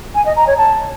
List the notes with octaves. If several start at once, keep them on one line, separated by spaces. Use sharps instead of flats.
G#5
D#5
A#5
C#5
A5